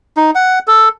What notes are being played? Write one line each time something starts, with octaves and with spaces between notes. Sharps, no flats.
D#4
F#5
A4